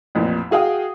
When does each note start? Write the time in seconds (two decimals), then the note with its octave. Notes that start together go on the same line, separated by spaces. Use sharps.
0.15 A1 F2 A#2
0.51 F#4 G#4 F5 G5 D#6